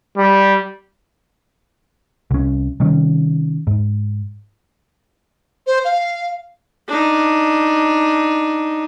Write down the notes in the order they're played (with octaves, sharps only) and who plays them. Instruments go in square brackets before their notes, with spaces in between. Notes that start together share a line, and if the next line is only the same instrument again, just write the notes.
[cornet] G3
[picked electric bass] C2 C#4
C3 D#3 G3 C#4
G#2
[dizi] C5
F5
[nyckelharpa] D4 D#4